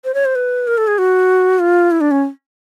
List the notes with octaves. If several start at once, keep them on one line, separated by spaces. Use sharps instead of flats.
C5
C#5
C5
B4
A#4
A4
G#4
F#4
F4
E4
D4
C#4